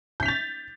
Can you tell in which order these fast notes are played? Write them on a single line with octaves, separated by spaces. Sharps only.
G6 B6 F7 A6